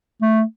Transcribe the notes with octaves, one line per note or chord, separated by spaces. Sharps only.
A3